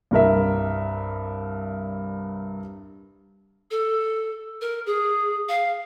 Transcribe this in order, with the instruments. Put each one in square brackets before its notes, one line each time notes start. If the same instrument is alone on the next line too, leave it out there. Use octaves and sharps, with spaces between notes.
[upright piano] C2 G2 A#4 E5
[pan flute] A4
A#4
G#4
F5